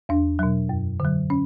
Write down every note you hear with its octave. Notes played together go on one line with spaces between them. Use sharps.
E2 D4
B2 F#3
F#2
D3 F#3
C#4